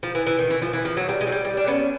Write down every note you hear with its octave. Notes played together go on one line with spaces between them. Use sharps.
F3
E3
E3
D#3
E3
F3
E3
F3
F#3
G3
G#3
F#3
G3
G3
D4
B3 C#4